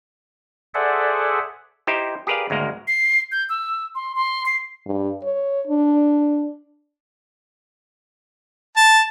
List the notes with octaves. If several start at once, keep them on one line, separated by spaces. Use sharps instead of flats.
G#4 A4 C5 D5 E5 F#5
D#4 E4 G4 C5
G4 G#4 A#4 B4 D5 F5
G#1 D2 G#3 A#3 A#4
C7
G6
E6
C6
C6
C7
G2
C#5
D4
A5